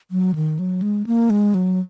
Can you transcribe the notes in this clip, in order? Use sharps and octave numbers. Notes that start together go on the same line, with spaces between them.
F#3
D#3
F#3
G#3
A#3
G#3
F#3